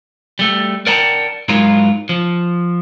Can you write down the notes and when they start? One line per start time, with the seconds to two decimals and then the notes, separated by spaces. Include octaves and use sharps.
0.39 G3 A3
0.87 A#4 D5 F#5 G5 A5 A#5
1.49 G#2 F#3 G#3 E4 F4 A#4
2.09 F3